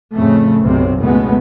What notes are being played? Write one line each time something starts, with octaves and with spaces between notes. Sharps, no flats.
F2 A2 C#3 A3
B1 F#2 C3 C4
F#1 C#2 B2 G#3 A3 B3